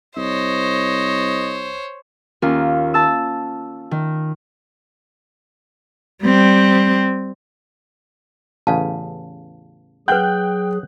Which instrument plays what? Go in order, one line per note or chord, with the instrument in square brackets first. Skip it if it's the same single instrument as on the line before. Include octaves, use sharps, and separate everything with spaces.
[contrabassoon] C2 [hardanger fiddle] C5 C#5 [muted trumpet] D#5
[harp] D#2 C#4 F4 A#4
A5 E6
D#3
[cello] G3 C4
[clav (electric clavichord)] A1 E2 C#3 [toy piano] F5 A5
[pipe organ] F#3 G#4 [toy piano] B4 F#5 [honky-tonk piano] G5 F#6 G6